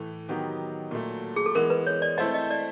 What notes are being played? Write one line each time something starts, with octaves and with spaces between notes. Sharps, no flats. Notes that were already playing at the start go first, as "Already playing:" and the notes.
Already playing: A2 E3 A3
D#3 F#3 B3 D#4 G4
A#2 F#3 A3
G#4
A4
E3 G#3 B3 A#4
B4
C#5
D5
A3 C4 E4 A4 C5 D#5
D#5
D5